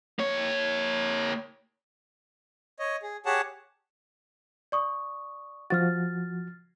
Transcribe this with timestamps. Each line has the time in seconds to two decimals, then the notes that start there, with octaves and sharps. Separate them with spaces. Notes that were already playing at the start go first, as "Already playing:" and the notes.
0.19 A#3 C#5
2.79 C#5 D#5
3.02 G#4
3.26 G4 G#4 C#5 F#5 A5
4.72 D5 C#6 D#6
5.70 F3 F#4 F6 A6